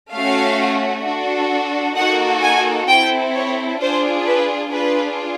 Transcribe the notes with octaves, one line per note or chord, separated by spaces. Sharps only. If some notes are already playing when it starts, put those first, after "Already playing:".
A3 C#4 F#4 F5
D4 F#4 A4
A#3 D#4 F#4 A4 F#5
G#5
C4 E4 A4 G5
C#5
D4 F4 G#4 C5
B4
D4 F4 G#4 B4